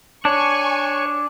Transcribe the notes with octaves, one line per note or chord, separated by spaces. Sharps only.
D4 C#5 G#5 C#6